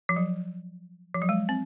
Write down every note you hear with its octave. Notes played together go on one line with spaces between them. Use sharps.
F3
F#3
F3
F#3
G#3
C4